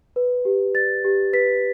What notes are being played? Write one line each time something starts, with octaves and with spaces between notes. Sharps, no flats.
B4
G4
D5 A6
G4
B4 B6